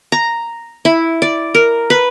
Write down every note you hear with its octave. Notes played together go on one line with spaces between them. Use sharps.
A#5
E4
D5
A#4
B4